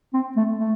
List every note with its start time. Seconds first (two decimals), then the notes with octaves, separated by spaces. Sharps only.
0.14 C4
0.36 A3
0.59 A3